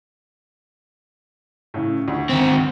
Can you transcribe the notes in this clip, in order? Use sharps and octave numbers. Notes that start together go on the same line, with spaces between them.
A2 C#3
D2
D#3 C4